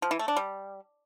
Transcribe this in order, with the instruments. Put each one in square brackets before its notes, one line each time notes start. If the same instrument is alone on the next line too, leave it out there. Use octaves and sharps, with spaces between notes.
[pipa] F3
E3
A3
D4
G3